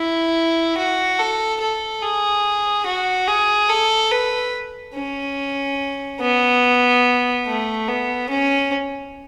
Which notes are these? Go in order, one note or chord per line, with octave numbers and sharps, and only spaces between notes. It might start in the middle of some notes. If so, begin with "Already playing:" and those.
Already playing: E4
F#4
A4
A4
G#4
F#4
G#4
A4
B4
C#4
B3
A3
B3
C#4